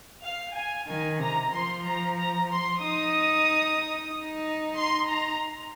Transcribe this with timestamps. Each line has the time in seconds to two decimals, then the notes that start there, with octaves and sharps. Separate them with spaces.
0.22 F5
0.55 G#5
0.87 D#3 G#5
1.20 C3 A#5
1.52 F3 C6
1.84 A#5
2.17 A#5
2.50 C6
2.82 D#4 D#6
4.11 D#4
4.76 C6
5.08 A#5